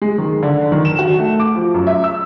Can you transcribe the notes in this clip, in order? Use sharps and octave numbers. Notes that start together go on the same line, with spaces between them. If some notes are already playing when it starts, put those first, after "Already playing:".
G#3
D#3
D3
D#3
E7
F#4
A3
D6
F3
F#2
E5
E6